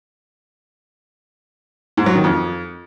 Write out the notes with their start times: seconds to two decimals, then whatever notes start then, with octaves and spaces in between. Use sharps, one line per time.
1.97 G#2
2.06 F#3
2.15 D#3
2.24 F2